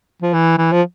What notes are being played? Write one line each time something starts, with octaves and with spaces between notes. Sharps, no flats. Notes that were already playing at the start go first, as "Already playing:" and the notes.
F3
E3
E3
F3